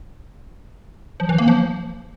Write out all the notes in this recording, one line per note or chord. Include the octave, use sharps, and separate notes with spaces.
F3
E3
A#3
F3